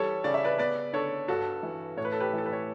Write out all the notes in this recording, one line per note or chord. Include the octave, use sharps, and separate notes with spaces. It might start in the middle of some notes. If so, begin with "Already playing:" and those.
Already playing: E3 G3 A4 C#5
C#3 D5
E5
B4 D5
B3 B4 D5
D3 A4 C#5
G2 F#4 A4
E3
A2 C#5
B4
A4
G4 B4
E3
A4
B4
C#5